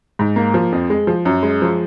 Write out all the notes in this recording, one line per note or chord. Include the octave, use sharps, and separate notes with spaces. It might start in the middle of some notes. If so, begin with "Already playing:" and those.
G#2
A#3
F3
F2
G#3
F3
F#2
G#3
F3